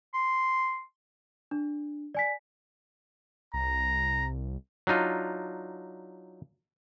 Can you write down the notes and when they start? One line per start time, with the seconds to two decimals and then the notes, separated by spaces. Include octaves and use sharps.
0.14 C6
1.51 D4
2.14 D5 G#5 B6
3.54 C2 A#5
4.87 F#3 D4 D#4 F4